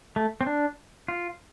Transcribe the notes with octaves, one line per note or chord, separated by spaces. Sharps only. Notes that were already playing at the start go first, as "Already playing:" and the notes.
A3
C4
D4
F4